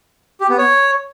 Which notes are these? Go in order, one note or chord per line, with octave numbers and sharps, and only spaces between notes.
G4
B3
C#5